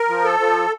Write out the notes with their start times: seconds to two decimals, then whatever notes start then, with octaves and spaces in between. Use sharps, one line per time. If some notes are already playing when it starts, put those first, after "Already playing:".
Already playing: A#4
0.09 F3
0.24 A4
0.40 F3